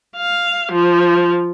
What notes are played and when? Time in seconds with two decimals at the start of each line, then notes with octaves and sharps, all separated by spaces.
0.15 F5
0.71 F3